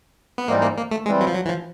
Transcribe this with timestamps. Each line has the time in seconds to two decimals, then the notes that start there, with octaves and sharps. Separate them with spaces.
0.38 B3
0.48 G#2 E3 G3 A#3 C4 D#4
0.62 A#3
0.77 A#3
0.91 A3
1.05 E3 G3 G#3 C4
1.21 F#3
1.27 F3
1.35 F#3
1.45 E3
1.49 F3